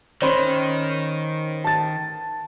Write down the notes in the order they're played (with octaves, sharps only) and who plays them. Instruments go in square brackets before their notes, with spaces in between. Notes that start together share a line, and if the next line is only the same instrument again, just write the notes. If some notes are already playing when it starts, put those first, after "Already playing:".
[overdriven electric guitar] D#3 [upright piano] C#4 [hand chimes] C5 B5 C6
[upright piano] A5 A6